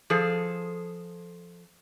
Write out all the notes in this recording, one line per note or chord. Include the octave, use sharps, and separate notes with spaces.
F3 G#4 A4